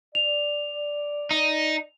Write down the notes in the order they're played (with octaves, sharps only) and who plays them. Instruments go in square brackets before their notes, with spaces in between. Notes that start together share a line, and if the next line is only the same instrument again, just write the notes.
[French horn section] D5 [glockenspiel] F7
[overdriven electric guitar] D#4